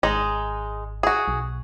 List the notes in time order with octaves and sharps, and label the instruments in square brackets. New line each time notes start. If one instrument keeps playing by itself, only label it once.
[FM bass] G#1 [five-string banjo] G#3 D#4
[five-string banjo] F#4 G#4
[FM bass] B1